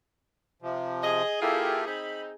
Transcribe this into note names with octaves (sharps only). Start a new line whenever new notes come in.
C3 F3
G#4 D#5
A#3 E4 F4 G4 A4
C4 D#4 B5